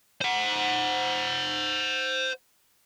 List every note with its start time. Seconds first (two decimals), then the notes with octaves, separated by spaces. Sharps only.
0.21 C5 F#5